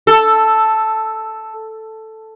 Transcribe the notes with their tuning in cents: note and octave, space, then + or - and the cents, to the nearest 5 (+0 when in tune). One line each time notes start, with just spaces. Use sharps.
A4 +0